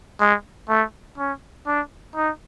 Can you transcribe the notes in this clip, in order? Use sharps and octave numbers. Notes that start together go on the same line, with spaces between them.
G#3
A3
C#4
D4
D#4